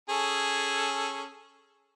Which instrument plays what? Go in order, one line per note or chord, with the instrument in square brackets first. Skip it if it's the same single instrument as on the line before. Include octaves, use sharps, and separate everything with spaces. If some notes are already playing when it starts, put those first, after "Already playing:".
[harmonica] C#4 G#4 A4